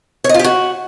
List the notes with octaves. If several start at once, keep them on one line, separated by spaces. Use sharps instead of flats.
C#5
D#5
F4
G4
F#4